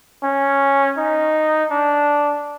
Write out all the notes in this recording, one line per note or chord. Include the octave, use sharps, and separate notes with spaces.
C#4
D#4
D4